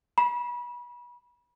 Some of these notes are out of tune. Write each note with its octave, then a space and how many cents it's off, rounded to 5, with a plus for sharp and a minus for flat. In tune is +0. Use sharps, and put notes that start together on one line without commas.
B5 -30